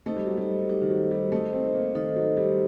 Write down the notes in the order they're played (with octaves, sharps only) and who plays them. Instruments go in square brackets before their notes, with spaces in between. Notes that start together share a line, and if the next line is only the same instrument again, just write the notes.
[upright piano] A3 [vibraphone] D#4 A4 C5 D#5
[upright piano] G3
F#3
G3
[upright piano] G3 [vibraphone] D#4 A4 C5 D#5
[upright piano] D#3
F#3
G3
[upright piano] A3 [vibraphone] D#4 A4 C5 D#5
[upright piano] C4
A#3
[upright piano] D#3 [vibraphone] D#4 A4 C5 D#5
[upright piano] F#3
G3